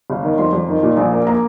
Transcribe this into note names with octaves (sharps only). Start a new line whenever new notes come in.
G1
D#3
F2 C6
F2
D#3
A#2
A#1
A#3
A#3 A#5